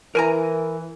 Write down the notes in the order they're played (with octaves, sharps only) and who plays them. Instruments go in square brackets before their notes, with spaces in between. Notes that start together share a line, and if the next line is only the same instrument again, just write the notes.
[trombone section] E3 [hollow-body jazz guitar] A#4 G#5 A#5